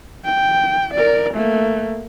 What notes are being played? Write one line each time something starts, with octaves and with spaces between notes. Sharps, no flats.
G5
A#4 D5
A3 A#3